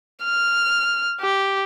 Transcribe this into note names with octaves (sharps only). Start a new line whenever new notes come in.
F6
G4